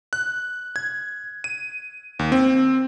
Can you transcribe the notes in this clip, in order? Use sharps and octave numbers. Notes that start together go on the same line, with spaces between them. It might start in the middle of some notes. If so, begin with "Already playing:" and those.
F#6
G#6
D#7
D#2
C4